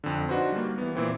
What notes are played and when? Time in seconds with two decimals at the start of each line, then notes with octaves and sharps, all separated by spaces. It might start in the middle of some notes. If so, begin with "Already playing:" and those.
0.04 F2 D3
0.29 D4 D#4 F#4 B4 C5
0.52 G3 A#3
0.78 E3 B3
0.95 A#2 E3 C4